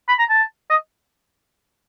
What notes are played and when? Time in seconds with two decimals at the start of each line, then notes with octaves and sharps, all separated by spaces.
0.09 B5
0.19 A#5
0.30 A5
0.70 D#5